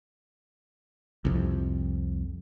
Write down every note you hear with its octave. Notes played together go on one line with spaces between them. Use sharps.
C2 F2